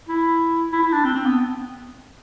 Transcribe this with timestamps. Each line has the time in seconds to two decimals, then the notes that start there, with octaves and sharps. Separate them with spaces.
0.09 E4
0.73 E4
0.83 E4
0.93 D4
1.05 C4
1.15 C4
1.26 B3